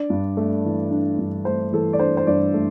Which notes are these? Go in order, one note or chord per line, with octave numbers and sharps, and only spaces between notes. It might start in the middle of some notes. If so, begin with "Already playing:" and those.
Already playing: D4 D5
G2
A3
E3
D4
G2
A3 C5
E3 A4
D5
D4 C5
C5
G2 D5
A3